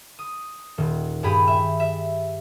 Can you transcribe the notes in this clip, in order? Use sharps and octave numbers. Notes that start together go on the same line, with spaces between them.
D#6
D#1
G2 G4 G#4 B5 D#7
E5
E5